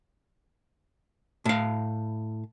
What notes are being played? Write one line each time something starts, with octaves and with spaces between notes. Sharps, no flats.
A2 F5